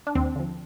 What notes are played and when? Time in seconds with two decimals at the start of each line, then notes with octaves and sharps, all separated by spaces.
0.07 D4
0.15 D#2 C4
0.36 D3 F3